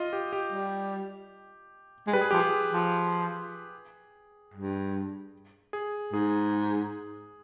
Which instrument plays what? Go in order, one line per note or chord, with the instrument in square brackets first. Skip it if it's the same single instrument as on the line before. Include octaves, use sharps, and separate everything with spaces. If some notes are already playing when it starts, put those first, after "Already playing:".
Already playing: [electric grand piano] F4 D#5
G4
G4
[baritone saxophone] G3
G#3
[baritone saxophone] G3 [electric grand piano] B4
[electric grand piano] G#4
[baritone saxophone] F3 [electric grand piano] G4
[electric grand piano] G#4
[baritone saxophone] F3
G2
[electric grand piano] G#4
[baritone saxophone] G#2 [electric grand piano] G#4